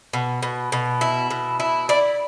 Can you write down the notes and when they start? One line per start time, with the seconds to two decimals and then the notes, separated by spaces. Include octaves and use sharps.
0.13 B2
0.43 B2
0.72 B2
1.01 E4
1.30 B2
1.60 E4
1.89 E4 D5